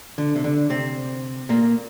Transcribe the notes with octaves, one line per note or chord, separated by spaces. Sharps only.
D3
C3
D3
C3 C4
A#2 A#3